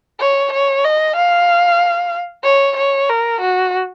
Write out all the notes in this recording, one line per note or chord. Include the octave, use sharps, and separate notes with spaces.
C#5
C#5
D#5
F5
C#5
C#5
A#4
F#4